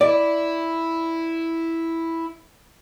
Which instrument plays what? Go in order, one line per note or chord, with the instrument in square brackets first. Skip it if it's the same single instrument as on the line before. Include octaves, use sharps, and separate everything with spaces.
[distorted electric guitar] E4 [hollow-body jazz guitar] D5